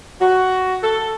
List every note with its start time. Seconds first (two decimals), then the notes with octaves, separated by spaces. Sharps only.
0.19 F#4
0.82 A4